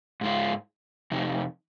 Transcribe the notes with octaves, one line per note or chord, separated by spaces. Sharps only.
G#2 G#3 F4
F2 C3 D#4